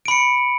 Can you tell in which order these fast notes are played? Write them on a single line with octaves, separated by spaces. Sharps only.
D7 B5 C#7